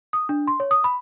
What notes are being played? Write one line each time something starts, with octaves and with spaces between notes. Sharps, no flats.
D#6
D4
C6
C#5
D#6
B5